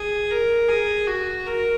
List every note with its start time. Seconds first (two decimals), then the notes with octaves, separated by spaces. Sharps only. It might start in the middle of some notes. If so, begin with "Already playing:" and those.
Already playing: G#4
0.31 A#4
0.69 G#4
1.07 F#4
1.46 A#4